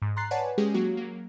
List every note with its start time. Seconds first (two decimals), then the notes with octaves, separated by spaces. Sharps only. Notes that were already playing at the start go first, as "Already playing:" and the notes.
0.02 G#2
0.16 A#5 C6 F#6 A6 C7
0.31 B4 C#5 D5 F#5 G#5 A5
0.58 G#3 C#4 G4 G#4
0.74 F#3 A#3 F#4
0.97 F#3 A#3